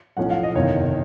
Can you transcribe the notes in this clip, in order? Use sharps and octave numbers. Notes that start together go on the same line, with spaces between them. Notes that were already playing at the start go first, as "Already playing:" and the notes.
B1 A2 F3 A3 C#4 F#5
F5
D#5
F#1 E2 C3 D#3 C#5